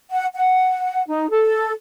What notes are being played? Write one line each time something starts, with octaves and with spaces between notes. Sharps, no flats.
F#5
F#5
D#4
A4